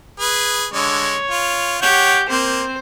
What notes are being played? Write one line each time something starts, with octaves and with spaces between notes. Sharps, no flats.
G#4 B4
D3 G#3 C#5
F4
G4 C#5 F#5 G6
A#3 C4 C5